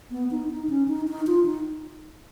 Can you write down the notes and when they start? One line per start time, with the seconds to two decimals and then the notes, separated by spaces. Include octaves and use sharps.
0.11 B3
0.31 D#4
0.50 D#4
0.69 C#4
0.88 D#4
1.08 D#4
1.27 F4
1.46 D#4